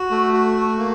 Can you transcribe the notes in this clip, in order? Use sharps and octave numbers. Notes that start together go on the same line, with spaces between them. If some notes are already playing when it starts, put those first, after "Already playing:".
Already playing: F#4
A3
F#4
A3
A#3